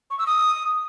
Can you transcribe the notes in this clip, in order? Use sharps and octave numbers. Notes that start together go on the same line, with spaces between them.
C#6
E6
D#6